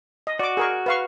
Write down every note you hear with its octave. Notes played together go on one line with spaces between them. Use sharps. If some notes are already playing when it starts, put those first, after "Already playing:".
D#5
F#4 D5 D6
G#4 A#4 C#6
B4 F5 C#6